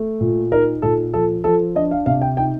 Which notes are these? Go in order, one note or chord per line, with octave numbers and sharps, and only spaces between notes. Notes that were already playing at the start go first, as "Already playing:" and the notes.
Already playing: A3
A#2
D#4 A#4
A#2 A4
F3 A4
F3 A4
D4 D#5
F5
C3 F5
G5
D#4 G5